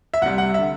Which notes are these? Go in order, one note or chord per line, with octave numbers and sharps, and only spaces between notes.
E5
C2 C3 G3 F#5
F#5
D3 E5